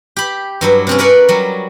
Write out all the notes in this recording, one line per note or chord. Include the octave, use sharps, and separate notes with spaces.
G4 B5
G2 F#3 E4
C3 C4 C#4
A#4 B4 C#5 D5 F#5 G#5
F#3 G3